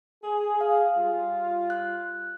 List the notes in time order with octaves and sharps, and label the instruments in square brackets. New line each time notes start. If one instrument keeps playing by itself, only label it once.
[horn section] G#4
[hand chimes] F5
[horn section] G3 F4
[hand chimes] F#6